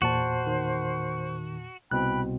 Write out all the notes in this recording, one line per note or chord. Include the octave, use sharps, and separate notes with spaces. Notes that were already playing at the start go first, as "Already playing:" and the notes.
E2 A#2 F#4 C5 A5
D#3
C2 B2 C4 G5 B5 F#6